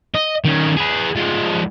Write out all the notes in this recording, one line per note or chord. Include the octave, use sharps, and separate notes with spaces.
D#5
D#3 C#4
G#4 B4
F3 G#3